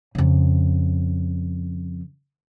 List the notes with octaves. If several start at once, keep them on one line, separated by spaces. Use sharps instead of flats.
F2 C#3